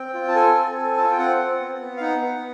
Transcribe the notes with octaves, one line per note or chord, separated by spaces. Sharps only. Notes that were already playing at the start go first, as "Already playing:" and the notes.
Already playing: C4 G5
F4
A5
A4 G#5
C4
A4
F4 A5
G#5
G5
C4 F#5
C4
B3
B3
F5
D#4 F#5
B3